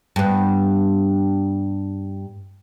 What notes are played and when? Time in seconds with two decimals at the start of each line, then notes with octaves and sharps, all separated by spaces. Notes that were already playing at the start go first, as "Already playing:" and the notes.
0.16 G2 B3